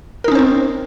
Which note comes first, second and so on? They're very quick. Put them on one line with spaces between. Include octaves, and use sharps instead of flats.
A#4 D#4 C#4 C5 C4